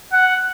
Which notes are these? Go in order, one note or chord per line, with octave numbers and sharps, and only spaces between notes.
F#5